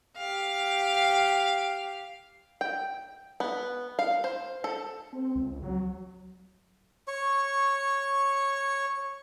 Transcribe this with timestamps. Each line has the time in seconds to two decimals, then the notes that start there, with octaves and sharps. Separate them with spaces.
0.18 G4 F5
2.61 G5
3.40 B3
3.99 F5
4.24 C5
4.64 A4
5.13 C4
5.35 C#2
5.63 F#3
7.08 C#5 C#6